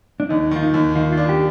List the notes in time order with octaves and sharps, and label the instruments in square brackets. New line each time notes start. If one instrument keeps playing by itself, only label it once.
[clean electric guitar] D4
[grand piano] D#2 [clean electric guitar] D#4
[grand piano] D#3 [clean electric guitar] F4
[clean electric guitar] D#4
[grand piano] D#2
[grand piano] D#3 [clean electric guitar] F4
[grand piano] D4 [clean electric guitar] F4
[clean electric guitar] G4